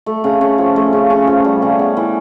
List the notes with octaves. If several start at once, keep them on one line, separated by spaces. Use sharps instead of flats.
A3
C#3
C#4
F3
A3
C#3
C#4
F3
G3
C#3
B3
E3